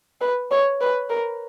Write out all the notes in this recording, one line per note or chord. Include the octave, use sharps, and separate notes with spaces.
B4
C#5
B4
A#4